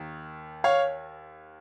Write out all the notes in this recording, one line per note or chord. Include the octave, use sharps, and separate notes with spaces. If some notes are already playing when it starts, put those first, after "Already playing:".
Already playing: D#2 D#3
C#5 F5